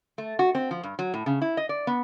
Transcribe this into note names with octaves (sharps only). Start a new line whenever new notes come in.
A3
F#4
C4
F3
G2
F#3
A2
C#3
E4
D#5
D5
B3